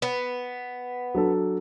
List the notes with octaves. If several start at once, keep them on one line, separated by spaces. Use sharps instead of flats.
B3
F#3 D4 A4